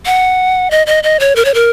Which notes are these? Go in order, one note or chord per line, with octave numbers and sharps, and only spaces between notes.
F#5
D#5
D#5
D#5
C#5
A#4
C#5
A#4